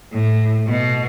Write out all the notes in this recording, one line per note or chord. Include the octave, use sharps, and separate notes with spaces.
A2
B2